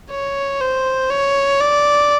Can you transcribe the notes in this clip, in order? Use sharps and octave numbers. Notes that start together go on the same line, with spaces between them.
C#5
C5
C#5
D5